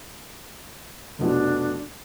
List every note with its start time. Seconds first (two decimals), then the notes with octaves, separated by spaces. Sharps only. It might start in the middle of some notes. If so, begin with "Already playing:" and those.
1.19 F1 B2 F3 D4